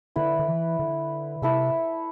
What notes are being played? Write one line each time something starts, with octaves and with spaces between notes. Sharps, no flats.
D3 E4 B4 D5
D3
E3
D3
C3 E4 A4 E5